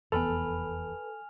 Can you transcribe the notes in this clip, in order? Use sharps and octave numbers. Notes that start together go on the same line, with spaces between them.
F1 E2 B3 A4 B4 G#5 F6 F7